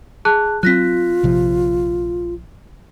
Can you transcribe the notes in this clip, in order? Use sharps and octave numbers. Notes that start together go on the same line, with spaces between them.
G#4 A5 F#6
F#3 C4 F4 F#6 A#6 B6
A#1 C3 F3